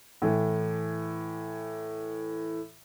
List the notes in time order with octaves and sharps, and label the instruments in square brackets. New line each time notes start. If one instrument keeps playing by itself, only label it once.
[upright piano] A2 E3